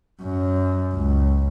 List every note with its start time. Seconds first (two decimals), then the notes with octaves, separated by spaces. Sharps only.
0.22 F#2
0.94 C#2